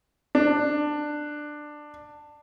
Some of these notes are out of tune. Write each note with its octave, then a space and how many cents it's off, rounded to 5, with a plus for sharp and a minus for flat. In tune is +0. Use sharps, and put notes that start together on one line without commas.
D4 +15